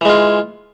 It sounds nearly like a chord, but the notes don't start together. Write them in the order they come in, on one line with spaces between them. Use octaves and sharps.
E3 G#3 F4